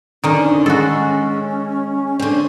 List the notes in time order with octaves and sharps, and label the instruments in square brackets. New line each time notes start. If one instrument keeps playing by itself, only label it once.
[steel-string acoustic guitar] F2 D3 D4 [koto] D#3 [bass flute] C#4
[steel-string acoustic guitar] G#3 [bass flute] C#4 [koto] F#4 A4
[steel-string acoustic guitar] D3 C4 [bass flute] C#4